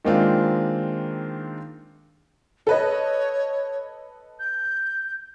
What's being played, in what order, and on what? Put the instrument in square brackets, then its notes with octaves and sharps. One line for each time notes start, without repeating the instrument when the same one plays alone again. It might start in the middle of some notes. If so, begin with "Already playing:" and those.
[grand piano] D#3 G#3 A#3 C4 D4 F4
[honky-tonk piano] A4 B4 D#5 [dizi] C#5
[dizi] G6